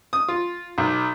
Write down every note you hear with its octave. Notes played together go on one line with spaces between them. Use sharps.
D#6
F4
B1